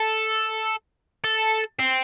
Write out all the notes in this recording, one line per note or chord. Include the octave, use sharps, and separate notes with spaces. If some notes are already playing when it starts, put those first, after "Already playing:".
Already playing: A4
A4
C4